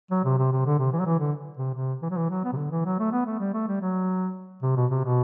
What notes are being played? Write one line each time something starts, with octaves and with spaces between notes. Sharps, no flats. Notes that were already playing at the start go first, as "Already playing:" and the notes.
F#3
C3
C3
C3
D3
C3
E3
F#3
E3
D3
C3
C3
E3
F#3
E3
F#3
B3
C3
D3
E3
F#3
A3
B3
A3
G3
A3
G3
F#3
C3
B2
C3
B2